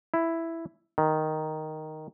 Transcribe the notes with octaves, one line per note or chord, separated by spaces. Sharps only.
E4
D#3